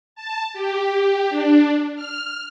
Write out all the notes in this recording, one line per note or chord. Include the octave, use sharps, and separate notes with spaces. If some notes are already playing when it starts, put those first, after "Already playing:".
A5
G4
D4
F6